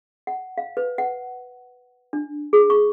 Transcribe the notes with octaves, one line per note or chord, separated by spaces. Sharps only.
F#5
F5
B4
F#5
D4
G#4
C#6